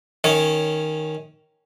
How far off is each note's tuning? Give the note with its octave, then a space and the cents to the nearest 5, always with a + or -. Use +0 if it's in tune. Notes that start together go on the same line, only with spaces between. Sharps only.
D#3 +0 C#4 +0 C#5 +5